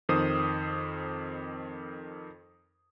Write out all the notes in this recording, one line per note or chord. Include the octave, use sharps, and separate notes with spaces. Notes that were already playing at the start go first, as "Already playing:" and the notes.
F2 D#3 C5 D#6